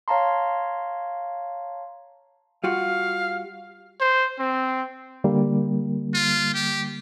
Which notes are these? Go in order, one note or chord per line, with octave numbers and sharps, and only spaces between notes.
C#5 F5 A5 A#5 C6
G3 F4 F#4 F5
C5
C4
D3 G3 A#3
F4
G4